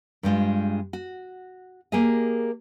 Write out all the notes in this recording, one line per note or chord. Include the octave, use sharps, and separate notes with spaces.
G2 G3 G#3 F4
F#4
A#3 G4 G#4 A#4 D#5